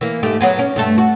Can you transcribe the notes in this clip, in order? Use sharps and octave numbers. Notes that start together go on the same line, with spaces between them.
E3 A#3
G#2 A3 G4
F#3 B3 G#4
C#4
G2 A3 A4
F#4